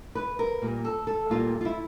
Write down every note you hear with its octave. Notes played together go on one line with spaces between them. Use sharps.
B4
A#4
A#2 G3 A#3
A4
A4
A#2 G3 A#3 F4
F4
E4